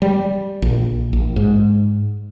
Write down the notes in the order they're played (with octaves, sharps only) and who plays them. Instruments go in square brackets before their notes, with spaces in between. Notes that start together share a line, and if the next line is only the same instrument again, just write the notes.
[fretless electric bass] G3
A#1
A#1
G#2